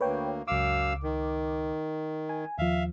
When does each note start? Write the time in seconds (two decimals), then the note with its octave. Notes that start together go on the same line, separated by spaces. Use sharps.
0.01 D2 A#3 B4 C#5 G5
0.48 C#2 F#2 F5 D6 E6
1.03 D#3
2.29 G#5
2.58 D#2 F3 E5 F5